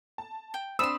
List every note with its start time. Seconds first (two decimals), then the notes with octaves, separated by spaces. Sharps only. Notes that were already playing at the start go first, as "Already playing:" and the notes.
0.18 A5
0.54 G5
0.79 C4 D4 B5 C6 D#6 E6 E7